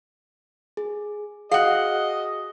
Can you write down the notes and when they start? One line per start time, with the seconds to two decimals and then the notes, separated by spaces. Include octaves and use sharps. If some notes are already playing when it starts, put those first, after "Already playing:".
0.77 G#4
1.51 F#4 G#4 D#5 F5 F#5